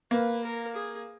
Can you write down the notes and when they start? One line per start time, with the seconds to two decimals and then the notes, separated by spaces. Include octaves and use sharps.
0.11 A#3 B4
0.43 A#4
0.75 G#4